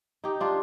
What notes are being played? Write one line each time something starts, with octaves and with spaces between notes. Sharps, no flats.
D#4 G4
D4 F4